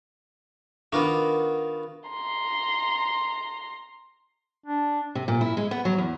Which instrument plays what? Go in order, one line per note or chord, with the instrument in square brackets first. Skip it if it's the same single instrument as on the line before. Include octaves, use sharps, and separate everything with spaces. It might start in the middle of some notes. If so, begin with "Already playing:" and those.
[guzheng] D#3 A#4 [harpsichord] B3 F4 F#4 [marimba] D4 D6
[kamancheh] A#5 C6
[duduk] D4
[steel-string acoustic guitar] C3
A#2
E4
G#3
B3
F#3
E2